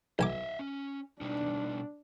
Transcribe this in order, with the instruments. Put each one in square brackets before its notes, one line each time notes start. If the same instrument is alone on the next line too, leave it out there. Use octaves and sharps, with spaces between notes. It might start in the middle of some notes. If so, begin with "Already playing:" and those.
[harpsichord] B1 G#5 D6 [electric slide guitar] D#5 E5
[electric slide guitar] C#4
[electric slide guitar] B2 G3 D#4 [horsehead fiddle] D4